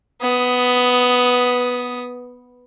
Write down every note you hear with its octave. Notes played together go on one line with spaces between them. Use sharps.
B3 D#6